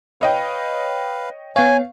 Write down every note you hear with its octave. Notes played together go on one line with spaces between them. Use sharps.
B4 C#5 D#5 F5 G5
B3 C#5 F5 G#5